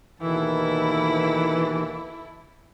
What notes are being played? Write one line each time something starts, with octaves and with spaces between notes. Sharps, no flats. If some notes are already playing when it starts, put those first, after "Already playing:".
D#2 B2 D#3 E3 E4 A4